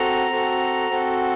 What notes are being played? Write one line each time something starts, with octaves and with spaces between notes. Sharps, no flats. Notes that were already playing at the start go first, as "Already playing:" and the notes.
Already playing: C4 F#4 A4 A#5
C4 F#4 A4
C4 F#4 A4